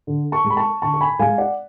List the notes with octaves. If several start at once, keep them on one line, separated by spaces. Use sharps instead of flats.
D3
A5 C#6
G#3
B5
A5 C#6
D3 A5 C#6
C#6
G#5 B5
G#3 F5 G#5
D5 F#5